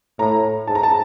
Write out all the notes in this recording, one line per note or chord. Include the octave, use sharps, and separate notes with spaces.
A2 A#5
G#2 A5
A#5
A5